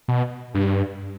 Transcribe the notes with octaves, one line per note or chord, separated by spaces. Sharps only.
B2
G2